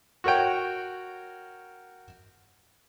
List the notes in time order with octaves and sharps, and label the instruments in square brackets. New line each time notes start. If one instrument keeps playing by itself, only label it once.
[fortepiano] F#4 A#4 C#5 G5